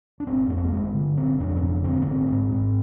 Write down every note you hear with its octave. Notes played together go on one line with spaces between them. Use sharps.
D4
G1 C4
F2 A#3
C4
A#3
G1 G#3
D3
G1 C4
F2 D4
C4
G1 D4
D3 C4
A#3
G#1 C4
G#2
G#2